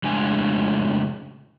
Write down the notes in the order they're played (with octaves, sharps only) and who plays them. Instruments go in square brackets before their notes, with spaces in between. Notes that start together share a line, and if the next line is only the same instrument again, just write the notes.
[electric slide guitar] F2 A2 C#3 G#3 D4 G#5